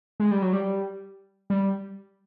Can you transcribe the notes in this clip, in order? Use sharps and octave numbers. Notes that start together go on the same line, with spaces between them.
G#3
G3
F#3
G3
G3